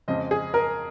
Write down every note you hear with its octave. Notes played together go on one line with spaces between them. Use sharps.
F2 C#3 G#3 C4 D#5
G#4
A#4